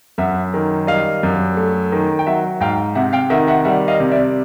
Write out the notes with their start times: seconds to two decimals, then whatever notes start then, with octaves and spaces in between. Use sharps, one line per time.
0.18 F#2 E5 F#5
0.54 D#3
0.87 G3 D#5 F5
1.23 F#2
1.57 A3
1.92 D#3
2.19 G5
2.26 F#3 E5 F#5
2.61 G#2 F5 G5
2.95 C3 E5 F#5
3.13 F5 G5
3.30 D#3 E5 F#5
3.48 E5 F#5
3.64 G3 E5 F#5
3.88 D#5 F5
4.00 C3
4.11 D5 E5